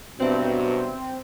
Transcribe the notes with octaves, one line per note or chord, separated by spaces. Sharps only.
G2 B2 F#3 C4 D4 C5 E5